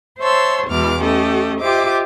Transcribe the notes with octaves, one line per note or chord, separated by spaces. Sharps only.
C5 C#5 E5 A5 C6 E6
E2 B2 E3 G#3 D6 F6
A3 C#4 G4 A4 D#5
F4 G4 C5 D#5 E5 D6